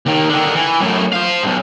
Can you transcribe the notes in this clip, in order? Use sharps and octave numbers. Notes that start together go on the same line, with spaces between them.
D#2 D#3
D3 D#3
E3
F#2 A2
C5 F5
B1 G#2